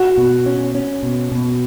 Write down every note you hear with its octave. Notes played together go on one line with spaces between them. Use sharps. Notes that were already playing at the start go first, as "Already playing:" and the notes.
Already playing: F#4
B2
C#4
C#4
B2
B2